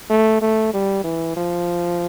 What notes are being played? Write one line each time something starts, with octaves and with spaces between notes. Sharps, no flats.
A3
A3
G3
E3
F3